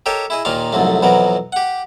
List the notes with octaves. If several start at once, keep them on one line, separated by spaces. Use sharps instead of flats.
G4 A4 A#4 C#5 D#5 G5
E4 G#4 D#5
D#2 A#2 D#3 A#3 F4 F5
C2 F2 G#2 F#3 A3
F2 B2 E3 F#3 A#4
G4 F#5